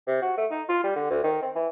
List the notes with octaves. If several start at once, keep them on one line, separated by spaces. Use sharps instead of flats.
C3
F#4
A3
D#4
F4
G3
D3
D2
D#3
C4
E3